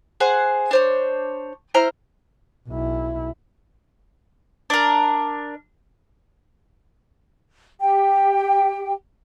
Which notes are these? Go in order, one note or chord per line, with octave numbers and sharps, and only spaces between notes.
G#4 C5 F#5
D4 C5 C#5
E4 C5 A#5 F6
B1 E4
D4 A#4
G4 G5